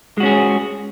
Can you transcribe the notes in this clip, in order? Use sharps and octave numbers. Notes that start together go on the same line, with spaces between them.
G#3 C#4 F#4 G#4